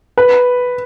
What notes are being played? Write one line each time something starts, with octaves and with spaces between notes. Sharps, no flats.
B4